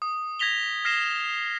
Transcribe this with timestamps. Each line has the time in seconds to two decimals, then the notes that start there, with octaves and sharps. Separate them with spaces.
0.02 D#6
0.39 G#6 A#6 B6 F7 G7
0.85 F6 A#6 C7 E7